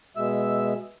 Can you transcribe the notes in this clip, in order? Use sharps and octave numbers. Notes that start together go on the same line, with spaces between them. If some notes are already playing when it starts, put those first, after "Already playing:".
B2 G#3 E5 E6